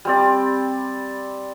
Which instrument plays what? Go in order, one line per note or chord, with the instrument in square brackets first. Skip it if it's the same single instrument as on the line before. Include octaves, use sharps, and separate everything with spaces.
[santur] G3 C4 D5